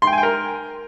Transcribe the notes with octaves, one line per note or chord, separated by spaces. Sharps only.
C6
G5
G#5
G5
A#4